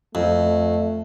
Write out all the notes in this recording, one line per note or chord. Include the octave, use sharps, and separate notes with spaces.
F2 A3